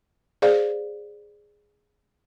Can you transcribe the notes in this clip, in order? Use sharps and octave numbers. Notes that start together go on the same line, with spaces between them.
G#4 C5 D5 F5